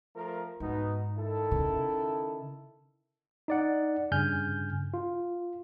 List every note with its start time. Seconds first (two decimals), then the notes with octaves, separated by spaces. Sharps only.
0.15 F3 A3 A#4
0.60 G#2 B2 B3 D#4
1.17 D#3 E4 A4
1.51 C#3
3.48 D#4 D5 F#5
4.12 G2 C#3 G#5 F6 G6
4.94 F4